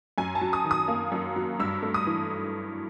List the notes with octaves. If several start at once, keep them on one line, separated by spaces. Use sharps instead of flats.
F#2 G#5
A5
F#3
D#6
D#3
D#6
A#3
F#2
F#3
G2 E6
A3
D#6
E3